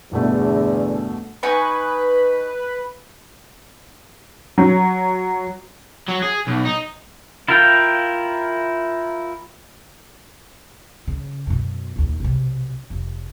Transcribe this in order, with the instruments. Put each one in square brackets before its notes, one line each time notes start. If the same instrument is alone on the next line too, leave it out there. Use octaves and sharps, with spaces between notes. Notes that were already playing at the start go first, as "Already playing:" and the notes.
[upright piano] G1 B2 A3 [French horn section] E2 D3
[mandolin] D#4 G#5 C#6 [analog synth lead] B4
[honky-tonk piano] F#3
[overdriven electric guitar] F#3
G#4
B1
D#4
[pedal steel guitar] E4 F4 A#4 F5 G5
[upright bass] C#3
F#2 B2
A#1 D#2
B1 C3
F1